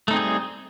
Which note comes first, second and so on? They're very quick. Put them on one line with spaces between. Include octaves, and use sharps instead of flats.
A3 D#4 C4 G#4 G3